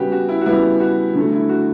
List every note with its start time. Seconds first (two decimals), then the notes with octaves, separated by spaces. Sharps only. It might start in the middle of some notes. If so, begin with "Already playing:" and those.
Already playing: C#3 G3 B3 F#4 G4
0.12 F#4
0.29 E4
0.41 F#4
0.45 C#3 G3 B3 E4
0.80 F#4
1.14 D3 F#3 A3
1.32 E4
1.49 F#4